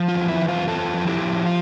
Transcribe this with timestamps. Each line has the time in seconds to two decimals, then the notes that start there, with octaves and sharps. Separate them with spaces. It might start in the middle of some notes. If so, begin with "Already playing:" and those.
Already playing: F3
0.08 F4
0.14 E2
0.28 E4
0.42 E2
0.48 F4
0.67 E2 F4 A4
0.94 F3
1.07 E4 G4
1.20 F3
1.46 F4